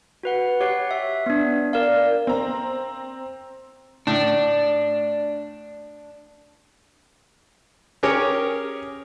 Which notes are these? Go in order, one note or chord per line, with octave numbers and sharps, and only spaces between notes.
F#4 B4 F#5
G4 C#5 F#5 F#6 C7
E5
B3 D4
A#4 D5 F5
C4 A#5
A2 D4
C#4 G4 G#4 A#4 C#5